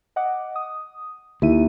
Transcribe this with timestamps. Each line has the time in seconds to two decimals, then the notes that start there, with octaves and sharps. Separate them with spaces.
0.16 D#5 F#5 D6
0.56 D#6
1.42 D#2 E4 E5 D#7